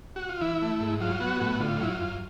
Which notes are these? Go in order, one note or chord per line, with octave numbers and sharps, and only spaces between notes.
F#4
F4
E3 E4
A3
G#2
F#3 F4
B3 F#4
A2 F#4
D3 F4
F#3 E4
F4
F#2